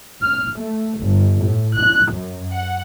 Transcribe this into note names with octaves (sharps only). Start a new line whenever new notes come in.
F6
A3
G1
A2
F#6
F#2
F#5